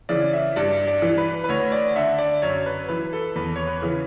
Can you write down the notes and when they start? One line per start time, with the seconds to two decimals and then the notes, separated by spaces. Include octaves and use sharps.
0.09 C#3 E3 D5
0.33 E5
0.56 G2 D5
0.88 D5
1.02 E3
1.18 B4
1.44 B4
1.49 D2 C#5
1.72 D5
1.96 D3 E5
2.19 D5
2.42 F#2 C#5
2.66 B4
2.88 E3 B4
3.13 A4
3.36 E2 B4
3.56 C#5
3.67 B4
3.82 C#3 E3